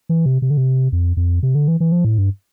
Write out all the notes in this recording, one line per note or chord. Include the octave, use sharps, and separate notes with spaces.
E3
C3
C3
D3
C3
F2
F2
C3
D3
E3
E3
F3
A2
G2